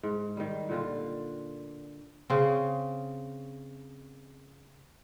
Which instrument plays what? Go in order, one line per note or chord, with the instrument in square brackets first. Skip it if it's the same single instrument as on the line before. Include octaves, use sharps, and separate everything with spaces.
[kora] G#2
D#3 G3
A#2 D3 F4
C#3 C4